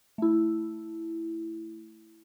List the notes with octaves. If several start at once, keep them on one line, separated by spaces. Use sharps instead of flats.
A3 E4